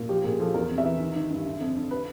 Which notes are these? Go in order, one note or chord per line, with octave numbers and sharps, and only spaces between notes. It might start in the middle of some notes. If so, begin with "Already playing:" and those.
Already playing: A#2
F3 G4
A#2 G#4
F3 A4
E2 A#4
C3
E5
E3
D#3
D#3
G2
D3
F2
D3
B4